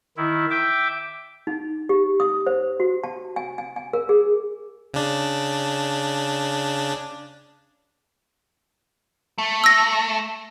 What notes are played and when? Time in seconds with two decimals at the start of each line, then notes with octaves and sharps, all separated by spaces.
0.17 D#3 E4
0.51 E5 G5 D6
1.47 D#4
1.89 G4
2.20 D#6
2.47 C5
2.80 F#4
3.04 A5
3.36 G#5
3.58 G#5
3.76 G#5
3.93 A#4
4.09 G#4
4.94 C#3 D4
9.38 A3
9.64 E6 A#6